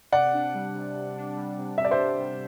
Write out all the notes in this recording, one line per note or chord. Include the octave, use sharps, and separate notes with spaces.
C3 D5 F#5
D4
G3
C3
C3
D4
G3
C3
C3 E5
D5
C5 E5
D4
G3